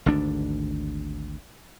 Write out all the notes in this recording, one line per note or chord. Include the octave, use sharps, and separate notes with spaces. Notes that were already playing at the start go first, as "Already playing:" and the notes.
G#1 D2 G#2 D4